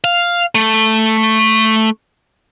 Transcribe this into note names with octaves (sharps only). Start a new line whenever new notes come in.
F5
A3